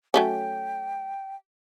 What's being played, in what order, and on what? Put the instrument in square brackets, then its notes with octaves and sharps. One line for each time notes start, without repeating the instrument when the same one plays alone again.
[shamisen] F#3 A3 C#4 [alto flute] G5